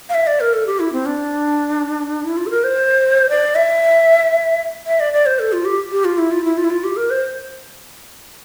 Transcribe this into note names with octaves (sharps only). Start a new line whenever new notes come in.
F5
E5
D5
A#4
A4
G4
E4
C4
D4
E4
F4
A4
A#4
C5
D5
E5
E5
D5
D5
C5
A4
F4
G4
G4
F4
E4
F4
E4
F4
E4
F4
G4
A#4
C5